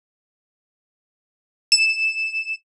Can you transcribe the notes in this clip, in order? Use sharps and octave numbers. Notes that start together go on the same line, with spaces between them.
E7